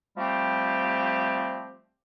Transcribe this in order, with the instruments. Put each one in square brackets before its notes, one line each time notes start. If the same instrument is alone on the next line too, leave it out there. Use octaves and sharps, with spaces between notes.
[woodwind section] F3 G3 A3 C4 G4